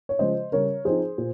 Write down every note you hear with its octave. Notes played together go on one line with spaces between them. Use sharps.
C#5
C#3 F3 G#3 C5 D#5
C#3 G3 C#4 A#4 C#5
F3 C4 D#4 G#4 C5
A#2